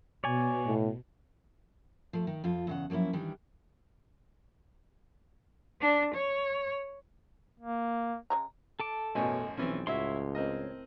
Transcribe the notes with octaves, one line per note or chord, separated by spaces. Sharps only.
B2 C#5 D5 G#5
A2
F3 A3
D#3
F2 F3 F4
E2 C#3 F#5
F3 F#3 A#3 C#4 E4
D#3 E3 G3 D4
D4
C#5
A#3
C#3 G#3 A#5
A4 A5 D6
A1 F#2 B2 C#5 D#5 G#5
B1 E3 F3 C4 C#4
C#2 A2 E4 F#4 C#5 E5 C6
C4 A#4 D#5